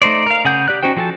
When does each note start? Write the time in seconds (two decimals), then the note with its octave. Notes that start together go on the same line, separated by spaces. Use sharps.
0.02 A3 D#4 C5 D5
0.26 A#4 F5
0.45 C#3 G#4 F#5 G6
0.68 G4 D5 F#6
0.83 C#4 D#4 F#4 C5 G5
0.97 F3 F#4 A4 G#5 A5